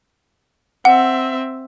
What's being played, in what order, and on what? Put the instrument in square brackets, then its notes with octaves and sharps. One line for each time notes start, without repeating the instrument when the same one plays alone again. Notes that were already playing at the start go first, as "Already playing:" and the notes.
[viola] C4 E5 [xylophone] F#5